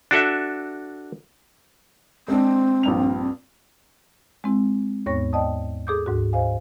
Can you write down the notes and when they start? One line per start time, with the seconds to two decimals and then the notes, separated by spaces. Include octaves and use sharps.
0.11 D4 F#4 A4 E5
2.28 G#3 C4 D4
2.83 A#1 G2 F7
4.44 G#3 C4 E4
5.06 D#2 G#2 B3 C#5 C#6 A#6
5.33 D5 D#5 G5 A5 D#6
5.87 G#4 A4 D6 D#6 G6
6.06 D2 G#2 F#4
6.33 C5 D#5 F5 G#5